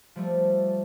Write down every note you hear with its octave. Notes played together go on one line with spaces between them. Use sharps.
F3 G3 A3